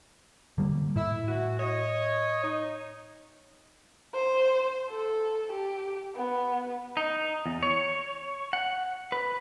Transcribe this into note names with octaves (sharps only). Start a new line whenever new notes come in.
D3 G3 A#3
A2 E4
E3 E4 F#4
C#5 D#5
D#4
C5
A4
G4
B3
D#4
E2
C#5
F#5
B4